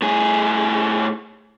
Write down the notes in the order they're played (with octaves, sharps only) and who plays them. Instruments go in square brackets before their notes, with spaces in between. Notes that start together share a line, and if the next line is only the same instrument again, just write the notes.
[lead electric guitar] A2 G#4